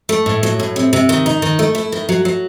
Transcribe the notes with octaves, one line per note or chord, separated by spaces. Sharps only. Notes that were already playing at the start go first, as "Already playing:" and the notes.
A3
A2
F#3
A2
C3
C3
D#3
D#4
D#3
A3
E4
D#3
F#3
F#3